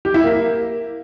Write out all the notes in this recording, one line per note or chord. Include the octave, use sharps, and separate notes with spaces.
G4
E4
A#3